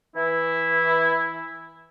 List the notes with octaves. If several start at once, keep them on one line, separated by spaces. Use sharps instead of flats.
E3 E4